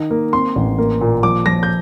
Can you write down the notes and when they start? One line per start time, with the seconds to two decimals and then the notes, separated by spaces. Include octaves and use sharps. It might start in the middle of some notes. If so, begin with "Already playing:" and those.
Already playing: D#3 D#5
0.11 A#3
0.33 C4 C6
0.56 A1
0.78 A#3
1.01 A#2
1.23 F3 D6
1.46 F3 A#6
1.63 G6